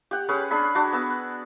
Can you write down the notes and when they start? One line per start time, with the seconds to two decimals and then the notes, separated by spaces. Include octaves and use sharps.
0.11 G4 F#5
0.29 C#4 G#4 B4
0.51 D4 G#4 B5
0.75 D4 F#4
0.93 B3 E6